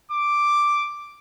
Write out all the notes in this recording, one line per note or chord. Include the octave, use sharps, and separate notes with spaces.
D6